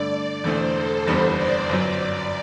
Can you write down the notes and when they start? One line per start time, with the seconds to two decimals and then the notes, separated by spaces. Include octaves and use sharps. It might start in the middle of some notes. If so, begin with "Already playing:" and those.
Already playing: G2 D3 A3 D5
0.13 D5
0.44 E1 E2 D3 A3 C5
0.76 A4
1.06 F#1 E2 D3 G3 B3 C5
1.37 D5
1.69 G1 F#2 F#3
2.01 D5